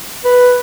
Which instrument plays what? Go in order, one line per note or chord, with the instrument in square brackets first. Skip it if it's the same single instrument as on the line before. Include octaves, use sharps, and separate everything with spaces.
[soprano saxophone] B4